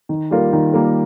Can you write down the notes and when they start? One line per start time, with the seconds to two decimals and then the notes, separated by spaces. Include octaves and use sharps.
0.09 D#3
0.31 G3 A#3 F4 A#4
0.53 D#3
0.74 G3 A#3 F4 A#4